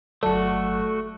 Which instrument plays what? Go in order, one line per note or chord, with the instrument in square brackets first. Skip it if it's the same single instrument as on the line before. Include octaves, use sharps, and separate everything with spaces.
[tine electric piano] G1 F#3 D5 [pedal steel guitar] A3 F#4 [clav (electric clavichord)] A4